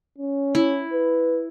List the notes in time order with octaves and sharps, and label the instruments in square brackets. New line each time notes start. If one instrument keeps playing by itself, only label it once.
[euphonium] C#4
[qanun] E4
[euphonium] B4